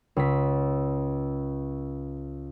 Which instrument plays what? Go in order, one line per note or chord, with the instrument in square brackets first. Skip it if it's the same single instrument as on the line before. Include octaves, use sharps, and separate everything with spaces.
[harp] C#2 B6